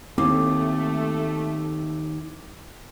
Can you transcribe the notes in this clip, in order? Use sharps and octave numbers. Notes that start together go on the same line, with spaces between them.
D#2 A3 C4 D6